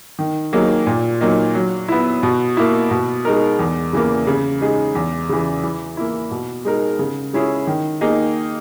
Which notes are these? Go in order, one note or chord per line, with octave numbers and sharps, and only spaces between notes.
D#3
F#3 A#3 D#4 G#4
A#2
F#3 A#3 D#4
F#3
B3 E4
B2
A#3 E4
B2
G#3 D#4 A#4
E2
C#3 E3 A#3
C#3
G#3 D#4 G#4
E2
C#3 E3
E3
A#3 E4
B2
G#3 D#4 A#4
C#3
G#3 C#4 E4 G#4
D#3
A#3 D#4 G#4